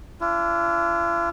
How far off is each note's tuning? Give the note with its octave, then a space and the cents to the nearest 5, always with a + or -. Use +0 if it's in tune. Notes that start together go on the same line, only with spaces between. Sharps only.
D4 -30 F4 -45